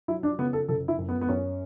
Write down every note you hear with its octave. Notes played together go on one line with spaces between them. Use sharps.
F#3 E4
D4
C#3 B3
A4
F#1 A4
E4
F#2
B3
B3
F#2 C#4